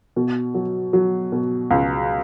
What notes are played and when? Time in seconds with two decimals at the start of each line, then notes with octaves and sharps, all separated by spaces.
0.16 B2
0.54 F#3
0.93 F#3
1.32 B2
1.71 C#2